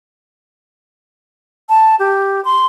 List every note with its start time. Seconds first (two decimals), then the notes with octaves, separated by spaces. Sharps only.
1.69 A5
1.99 G4
2.45 C6